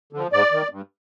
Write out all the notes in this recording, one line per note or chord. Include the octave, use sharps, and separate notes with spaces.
D3 F3
G#2 D5
D#3
G2